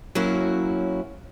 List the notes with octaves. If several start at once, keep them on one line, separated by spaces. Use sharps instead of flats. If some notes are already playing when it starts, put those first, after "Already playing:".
F#3 A#3 C#4 E4 F#4